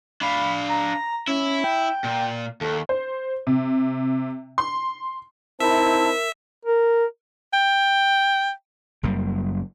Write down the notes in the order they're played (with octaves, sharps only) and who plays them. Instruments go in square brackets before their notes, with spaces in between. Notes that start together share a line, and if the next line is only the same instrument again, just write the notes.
[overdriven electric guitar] D4 F5 [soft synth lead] B5
[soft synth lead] A#5
[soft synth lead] C#4 [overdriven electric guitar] E4
[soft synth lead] G5
[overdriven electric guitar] A#2
[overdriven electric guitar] D#2 [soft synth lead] A4
[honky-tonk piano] C5
C3
C6
[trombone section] C4 D#4 E4 [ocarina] A#4 [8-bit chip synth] E5 [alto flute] A5
[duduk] A#4
[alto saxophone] G5
[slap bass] F#1 F#2 G3 A#3